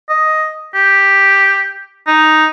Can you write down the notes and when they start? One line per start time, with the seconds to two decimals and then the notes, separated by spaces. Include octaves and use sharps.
0.09 D#5
0.74 G4
2.07 D#4